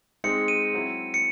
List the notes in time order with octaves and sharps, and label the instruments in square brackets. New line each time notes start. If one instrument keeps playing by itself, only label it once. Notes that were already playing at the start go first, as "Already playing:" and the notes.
[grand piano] G#3 C4 D#4 G#4 [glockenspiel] C#7
[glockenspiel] D#7
[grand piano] F#3 C4 E4
[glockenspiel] C#7